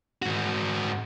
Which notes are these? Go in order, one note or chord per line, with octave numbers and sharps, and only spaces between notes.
G#2 F#4